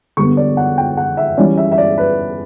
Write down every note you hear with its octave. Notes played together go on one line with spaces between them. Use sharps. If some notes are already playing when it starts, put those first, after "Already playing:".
D3 G3 B3 C#6
D5
F#5
G5
F#5
E5
E3 G3 C#4 D5
E5
E5
D5
B4